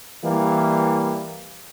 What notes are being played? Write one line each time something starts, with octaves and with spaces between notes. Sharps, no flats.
E3 G3 A#3